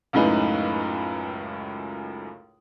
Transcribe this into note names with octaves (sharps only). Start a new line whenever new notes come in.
C#2 F#2 A2 D#4 B4